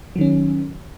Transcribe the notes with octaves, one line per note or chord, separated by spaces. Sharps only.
D#3 F#3 C#4